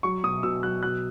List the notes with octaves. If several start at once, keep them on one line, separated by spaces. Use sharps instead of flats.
F#3 C#6
B2 D#6
B2 E6
F#3 F#6
B2 F#6